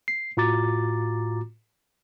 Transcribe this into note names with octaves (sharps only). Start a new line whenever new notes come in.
C7
A2 F4 F#4 A#5 D6 A6